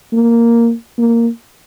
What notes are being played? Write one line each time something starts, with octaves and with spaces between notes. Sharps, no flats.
A#3
A#3